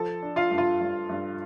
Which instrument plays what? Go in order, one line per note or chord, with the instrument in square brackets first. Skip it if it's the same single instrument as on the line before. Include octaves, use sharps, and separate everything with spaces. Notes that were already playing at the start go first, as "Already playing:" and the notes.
Already playing: [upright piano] F3 A4 A5
D4
F4 F5
G2
F4 F5
G2
G2